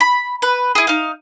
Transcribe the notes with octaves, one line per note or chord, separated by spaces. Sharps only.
B5
B4
E4 G#4
D#4 F5